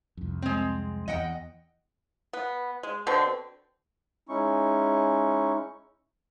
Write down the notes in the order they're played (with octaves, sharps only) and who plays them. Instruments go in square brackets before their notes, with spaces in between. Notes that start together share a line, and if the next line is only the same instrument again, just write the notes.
[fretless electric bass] C2 F2
[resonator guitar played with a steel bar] G#3 C4
[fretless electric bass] E2 [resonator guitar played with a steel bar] D#5 F#5 G5
[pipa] B3
G#3
B2 D3 C4
[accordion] G#3 C#4 D#4 E4 C#6